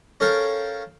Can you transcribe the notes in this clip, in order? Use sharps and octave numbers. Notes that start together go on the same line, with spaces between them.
C#4 A4 A#4 F5 G5